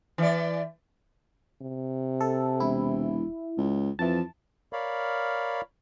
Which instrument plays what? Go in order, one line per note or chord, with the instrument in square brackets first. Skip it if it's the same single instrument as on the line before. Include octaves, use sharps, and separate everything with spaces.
[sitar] E3 D5
[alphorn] C3
[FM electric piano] A4
[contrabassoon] E1 [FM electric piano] E4
[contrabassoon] C#2
[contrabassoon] F2 [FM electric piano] E3 A5
[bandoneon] A#4 C#5 D5 F5 B5